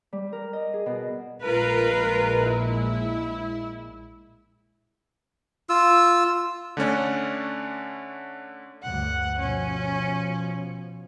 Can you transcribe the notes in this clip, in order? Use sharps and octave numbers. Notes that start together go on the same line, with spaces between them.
G3
A#4
D#5
G#4
B2
A#1 A#2 G#3 F4 A#4 B4
E4
F4 E6
D3 A3 C#4 D4
D2 G2 F#5
B2 F3 C#4